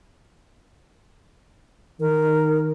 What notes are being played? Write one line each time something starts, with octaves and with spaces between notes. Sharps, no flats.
D#3 A#4